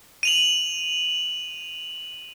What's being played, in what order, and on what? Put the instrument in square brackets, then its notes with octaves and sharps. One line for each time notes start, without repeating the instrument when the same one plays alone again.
[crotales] D#7 F7 F#7